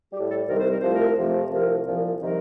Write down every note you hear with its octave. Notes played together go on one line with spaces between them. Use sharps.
A2 G3 G4
A4
C2 C3 D#3 G3 A#4
C5
A#4
C2 C3 F3 A3 C5
A#4
F2 C3 F3 A3
C2 C3 F3 A#4
C2 A#2 F3
C3 D#3 G3 A#4